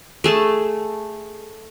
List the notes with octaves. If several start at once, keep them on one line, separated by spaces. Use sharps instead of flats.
A3 G#4 A5